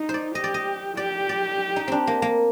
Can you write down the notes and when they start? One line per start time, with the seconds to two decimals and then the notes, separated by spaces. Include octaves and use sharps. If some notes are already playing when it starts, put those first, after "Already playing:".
Already playing: D#4
0.09 C5
0.14 D5
0.35 G4 D#5
0.44 D5
0.54 D#5
0.97 G4 D5
1.29 D5
1.76 D#4
1.88 C4 D4
2.07 A#3
2.22 A#3